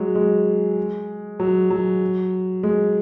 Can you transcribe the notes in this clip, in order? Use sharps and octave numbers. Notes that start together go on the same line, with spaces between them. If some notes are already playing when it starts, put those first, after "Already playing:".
Already playing: F#3 G#3
G#3
F#3
F#3
G#3